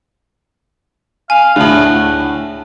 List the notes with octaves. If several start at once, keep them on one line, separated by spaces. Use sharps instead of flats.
F5 G#5
D2 A2 D4 F#5 A5